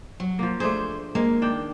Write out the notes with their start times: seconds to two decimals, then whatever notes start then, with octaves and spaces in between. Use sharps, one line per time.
0.20 F#3
0.39 F3 A#3
0.60 A3 D4 G#4 C5
1.15 G#3 A#3
1.42 D#3 D4 G5